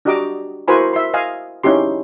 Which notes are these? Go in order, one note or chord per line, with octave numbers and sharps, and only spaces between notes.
D4 F#4 G4 D#5 A#5 D6
E4 F#4 A#4 C5 G#5 B5
E5 C6
D#5 F5 G#5
C#4 D#4 E4 G4 C6